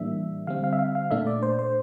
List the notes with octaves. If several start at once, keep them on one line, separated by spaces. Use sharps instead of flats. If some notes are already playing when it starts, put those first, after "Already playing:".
Already playing: A2 E3 G3 A#3 D4 E5
D3 G3 C4 F5
F5
E5
F5
F5
A#2 A3 D4 E5
D5
C5
C5